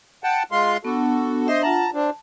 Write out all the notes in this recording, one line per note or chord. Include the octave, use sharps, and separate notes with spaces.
F#5 G5 A5
G#3 F4 C6
B3 D4 F#4 A4
D4 C5 D#5 E5 C6
F4 F#5 A5 A#5
C4 D4 A5